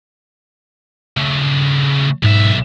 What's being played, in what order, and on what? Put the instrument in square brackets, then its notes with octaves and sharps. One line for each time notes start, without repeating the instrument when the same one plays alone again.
[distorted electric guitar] C#3 A3
[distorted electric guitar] B1 E5 [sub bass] G#2